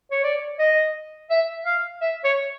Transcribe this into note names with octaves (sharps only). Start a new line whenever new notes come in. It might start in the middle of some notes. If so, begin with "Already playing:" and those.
C#5
D5
D#5
E5
F5
E5
C#5